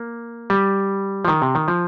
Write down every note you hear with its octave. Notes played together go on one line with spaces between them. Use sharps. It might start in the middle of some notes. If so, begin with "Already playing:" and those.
Already playing: A#3
G3
F3
D#3
C3
D#3
F3